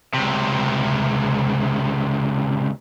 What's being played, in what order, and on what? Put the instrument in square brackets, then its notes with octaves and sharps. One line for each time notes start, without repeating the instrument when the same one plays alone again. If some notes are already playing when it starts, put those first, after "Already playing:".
[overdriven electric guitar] C#2 C3